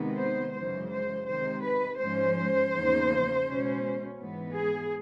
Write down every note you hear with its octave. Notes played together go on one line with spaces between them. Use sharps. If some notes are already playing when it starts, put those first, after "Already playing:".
Already playing: C3 D#3 G#3 B3
C5
F#2 C#3 E3 G#3 C5
C5
C3 D#3 G#3 C5
B4
G#2 F3 G#3 C#4 C5
E2 C#3 F3 A#3 D#4
B2 G#3 C#4
G#2 E3 G#3 B3
G#4